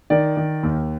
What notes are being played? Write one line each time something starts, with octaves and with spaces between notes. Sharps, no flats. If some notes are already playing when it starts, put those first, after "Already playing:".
D#3 D5
D#3
D#2